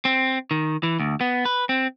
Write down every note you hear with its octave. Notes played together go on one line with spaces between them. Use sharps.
C4
D#3
E3
D2
B3
B4
C4